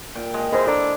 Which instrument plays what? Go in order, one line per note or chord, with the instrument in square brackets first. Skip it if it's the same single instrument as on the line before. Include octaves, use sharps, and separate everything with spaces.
[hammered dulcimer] A#2 G5
G#3 G4 D#5
[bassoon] G#3 [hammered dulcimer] E4 [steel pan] A#4 C5
[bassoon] D4 [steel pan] A4 A#5